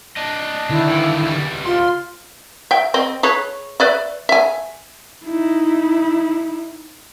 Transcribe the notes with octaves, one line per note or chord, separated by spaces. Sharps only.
D4 D#5
D3 D#3 E4
E3 F3
C#2 G3
F4 C6
E5 G5
C4 D#5
G#4 B4 C#5
B4 D5 E5
E5 G#5
D#4 E4